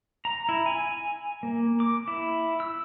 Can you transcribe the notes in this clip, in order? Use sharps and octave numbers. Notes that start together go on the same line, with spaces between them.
A#5
E4
G#5
A#3
D6
E4
E6